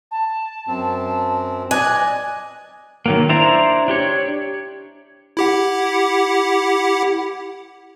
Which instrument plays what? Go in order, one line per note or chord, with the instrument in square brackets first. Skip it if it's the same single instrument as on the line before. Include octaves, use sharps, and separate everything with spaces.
[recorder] A5
[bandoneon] F#2 C4
[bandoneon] D5 D#5 [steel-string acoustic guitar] G#5 [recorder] F#6
[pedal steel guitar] D#3 F#3 A#3
D4 E4 C5 D5 A#5
D4 G4 C#5
[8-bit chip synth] E4 G4 F#5